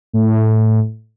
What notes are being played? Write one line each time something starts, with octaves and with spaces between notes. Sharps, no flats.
A2